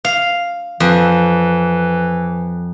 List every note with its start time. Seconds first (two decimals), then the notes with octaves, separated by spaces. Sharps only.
0.05 F5
0.80 F2 E3